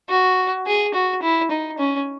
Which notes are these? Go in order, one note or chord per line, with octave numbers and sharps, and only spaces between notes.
F#4
G#4
F#4
E4
D#4
C#4